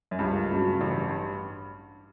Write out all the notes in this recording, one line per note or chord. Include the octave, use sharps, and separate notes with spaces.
F#2
C#2 G2
C#3 F#3 C#4
A1